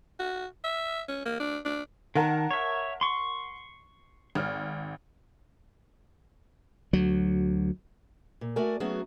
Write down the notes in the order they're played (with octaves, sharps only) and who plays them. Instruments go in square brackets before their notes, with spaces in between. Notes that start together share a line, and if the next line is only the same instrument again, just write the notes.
[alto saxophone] F#4
E5
C#4
A#3
D4
D4
[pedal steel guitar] D#3 [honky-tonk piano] A#4 F#5 A5
[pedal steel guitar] C#5 E5
C6 C#6
[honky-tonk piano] G#1 F6
[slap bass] D2 F#3
[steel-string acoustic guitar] A#2
A3 F#4 A#4 D5 G#5
F#3 A3 B3 C#4 F#4 G#4